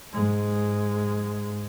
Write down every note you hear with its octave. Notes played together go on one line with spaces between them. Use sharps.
G#2 G#3